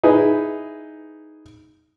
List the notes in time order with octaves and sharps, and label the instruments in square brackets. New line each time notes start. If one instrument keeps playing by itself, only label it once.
[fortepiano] D#4 E4 G#4 B4